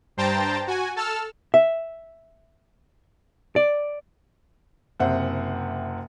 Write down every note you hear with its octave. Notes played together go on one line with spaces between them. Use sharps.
G2 C5 G5 A5 A#5 A6
F#4 G#5
A4 A5 E6 F6
E5
D5
F#1 C3 C5 E5 F#5